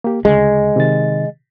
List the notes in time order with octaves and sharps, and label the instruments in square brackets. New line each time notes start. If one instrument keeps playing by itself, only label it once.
[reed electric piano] A#3 G4
[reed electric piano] D2 C#3 [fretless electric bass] G#3
[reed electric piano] C3 D#3 A6